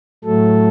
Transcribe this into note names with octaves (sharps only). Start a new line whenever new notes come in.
A2 F#3 A3 A4